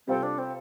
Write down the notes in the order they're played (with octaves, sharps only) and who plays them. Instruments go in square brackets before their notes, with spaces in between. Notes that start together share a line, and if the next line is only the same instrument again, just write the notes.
[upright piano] C3 G3 F4 A4 [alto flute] C4
[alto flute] D4
C4